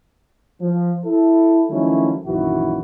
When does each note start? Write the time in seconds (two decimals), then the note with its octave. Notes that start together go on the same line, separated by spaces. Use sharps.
0.61 F3
1.05 E4 A4
1.70 D#3 F3 F#3 A3 C#4 E4
2.26 A#1 F#2 D#3 E3 E4 F#4